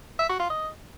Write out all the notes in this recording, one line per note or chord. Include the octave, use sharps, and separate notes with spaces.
E5
F#4
F4
D#5